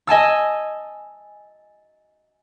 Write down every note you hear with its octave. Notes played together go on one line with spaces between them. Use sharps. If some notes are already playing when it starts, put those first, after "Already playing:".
D#5 G#5 A5 E6